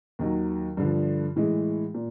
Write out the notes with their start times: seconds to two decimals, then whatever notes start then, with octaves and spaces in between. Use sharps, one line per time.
0.19 D#2 D#3 F#3
0.77 G2 D3 F3
1.36 A2 E3 G#3
1.95 A#2